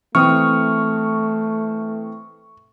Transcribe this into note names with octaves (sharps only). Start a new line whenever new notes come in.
E3 A3 C4 C#6 D#6 F6